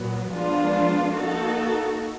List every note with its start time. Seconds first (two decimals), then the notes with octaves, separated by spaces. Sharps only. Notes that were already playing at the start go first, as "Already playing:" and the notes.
Already playing: A#2 F#3 B3
0.29 F3 G#3 B3 D4 F4
1.11 A#3 D#4 F#4 A4